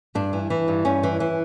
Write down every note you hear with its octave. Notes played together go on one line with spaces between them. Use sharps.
G2 D4
E3
E3
G2
G2 C#4
E3
E3